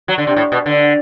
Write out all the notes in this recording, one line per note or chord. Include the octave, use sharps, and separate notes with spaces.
F#3
D3
C3
A2
B2
D3